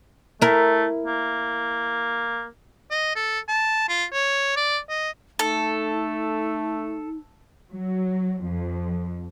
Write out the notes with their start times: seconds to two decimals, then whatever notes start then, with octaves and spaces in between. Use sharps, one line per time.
0.42 A3 E4 A#4
1.06 A#3
2.91 D#5
3.15 A4
3.48 A5
3.89 F4
4.13 C#5
4.56 D5
4.89 D#5
5.39 A3 D#4 A4
7.73 F#3
8.43 F2